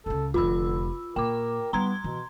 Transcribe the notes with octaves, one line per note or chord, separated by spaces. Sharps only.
C#2 C#3 A4
F1 F2 D3 F4 B5 E6
A#2 A#4 G5 D6
G3 B3 D#4 A#5 C6 G#6
B2 E3